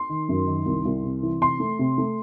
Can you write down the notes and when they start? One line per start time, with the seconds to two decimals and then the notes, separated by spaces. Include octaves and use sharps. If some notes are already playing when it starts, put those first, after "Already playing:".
Already playing: C6
0.09 D#3
0.29 F#2
0.47 D#3
0.66 C2
0.85 C2
1.03 C3
1.23 E3
1.41 C3 C6
1.60 A3
1.79 C3
1.98 A3